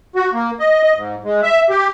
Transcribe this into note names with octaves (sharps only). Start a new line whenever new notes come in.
F#4
A#3
D#5
D#5
G#2
G#3
E5
G4